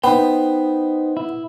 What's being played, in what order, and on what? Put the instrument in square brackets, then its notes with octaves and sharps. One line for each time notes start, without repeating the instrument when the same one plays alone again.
[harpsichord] B3 [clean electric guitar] D#4 C5 G5
[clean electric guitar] E4